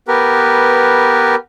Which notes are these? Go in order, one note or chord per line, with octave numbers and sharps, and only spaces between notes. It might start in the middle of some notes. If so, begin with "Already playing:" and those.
B3 G4 A#4 B4